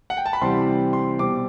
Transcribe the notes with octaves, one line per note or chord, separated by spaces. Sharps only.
F#5
G5
A5
B5
C3 E3 G3 C4 C6
C6
B2 G3 C4 D6